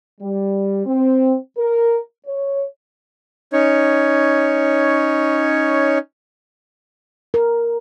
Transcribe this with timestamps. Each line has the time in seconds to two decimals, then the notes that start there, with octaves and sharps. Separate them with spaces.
0.21 G3
0.86 C4
1.57 A#4
2.26 C#5
3.53 C#4 D#4 C#5
7.34 A#4